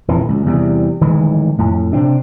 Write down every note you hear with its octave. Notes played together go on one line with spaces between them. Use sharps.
D#1 F2 E3
C#2
E2 C3 G3
D1 D#3 E3 G#3
F2 A2
C3 C4 D4